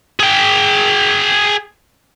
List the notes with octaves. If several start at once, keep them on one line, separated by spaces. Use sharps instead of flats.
G#4 G5